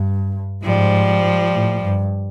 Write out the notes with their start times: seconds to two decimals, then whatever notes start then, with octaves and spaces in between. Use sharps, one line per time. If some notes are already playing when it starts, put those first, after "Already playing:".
Already playing: G2
0.63 G#2 F3 G3
1.53 A2
1.82 G2